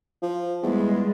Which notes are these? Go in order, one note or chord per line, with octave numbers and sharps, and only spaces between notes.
F3
E2 G3 G#3